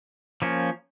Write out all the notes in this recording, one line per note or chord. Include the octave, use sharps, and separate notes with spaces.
F3 A#3 C#4